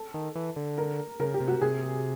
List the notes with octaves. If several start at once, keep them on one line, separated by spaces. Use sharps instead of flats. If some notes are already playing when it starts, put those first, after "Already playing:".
Already playing: A4
D#3
E3
D3
A#4
C#3 A#4
G4
C3
F#4
C3 G#4